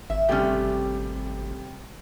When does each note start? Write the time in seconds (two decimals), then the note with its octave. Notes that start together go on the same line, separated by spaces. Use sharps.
0.10 G#1 E5
0.29 C3 G3 A3 C#4 G4